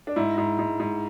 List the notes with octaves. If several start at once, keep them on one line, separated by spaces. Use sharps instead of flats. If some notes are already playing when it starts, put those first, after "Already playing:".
D4
G#2 E4
G#2
G#2
G#2